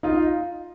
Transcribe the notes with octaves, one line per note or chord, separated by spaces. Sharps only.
D#4 F4